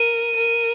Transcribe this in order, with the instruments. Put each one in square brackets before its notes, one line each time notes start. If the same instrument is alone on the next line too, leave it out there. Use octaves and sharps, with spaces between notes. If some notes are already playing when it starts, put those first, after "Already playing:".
Already playing: [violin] A#4 [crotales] D#7
[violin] A#4